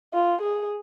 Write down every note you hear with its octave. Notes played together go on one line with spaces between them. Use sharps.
F4
G#4